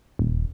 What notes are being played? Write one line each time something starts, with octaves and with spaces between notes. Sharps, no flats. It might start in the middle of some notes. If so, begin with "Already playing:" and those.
D#1